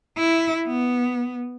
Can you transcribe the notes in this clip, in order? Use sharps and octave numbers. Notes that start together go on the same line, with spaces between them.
E4
B3